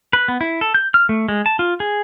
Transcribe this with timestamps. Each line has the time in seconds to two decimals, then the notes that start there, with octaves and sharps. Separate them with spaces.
0.13 B4
0.28 B3
0.41 E4
0.61 A4
0.74 G6
0.94 F6
1.09 A3
1.29 G#3
1.46 A5
1.59 F4
1.80 G#4